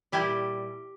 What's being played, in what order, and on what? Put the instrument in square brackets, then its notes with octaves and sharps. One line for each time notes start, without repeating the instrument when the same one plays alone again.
[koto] A#2 G3 E4 G4